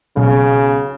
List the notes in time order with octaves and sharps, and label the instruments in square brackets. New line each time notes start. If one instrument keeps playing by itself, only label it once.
[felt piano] B1 [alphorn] C#3